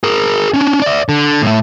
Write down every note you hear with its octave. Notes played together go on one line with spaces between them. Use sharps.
G#4 A#4
C#4 D4
D5 E5
D3
A2 A3